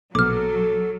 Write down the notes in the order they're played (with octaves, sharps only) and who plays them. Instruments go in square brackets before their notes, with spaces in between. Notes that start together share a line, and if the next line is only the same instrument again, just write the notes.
[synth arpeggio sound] A#1 B2 [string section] F#3 [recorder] A4 [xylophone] D6 F6